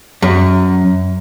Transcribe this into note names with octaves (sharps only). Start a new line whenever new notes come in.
F#2